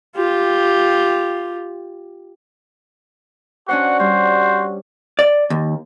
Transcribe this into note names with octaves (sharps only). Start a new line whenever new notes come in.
F4 G4
C#4 D4 F#4 C5 F#5
G3 C5
D5
D#2